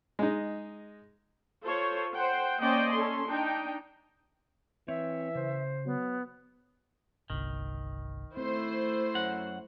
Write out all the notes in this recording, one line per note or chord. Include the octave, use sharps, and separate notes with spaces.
G#3 D#4
F4 A4 C5 C#5
C5 F#5 G5
A#3 C#4 C5 D5 D#5 G5
C#4 A4 C6
D4 D#4 G5
E3 C4 C#5 E5
C#3 C5
F#3 B3
G1 C2 D#3
A3 C4 E4 C5
F#2 F#3 F#5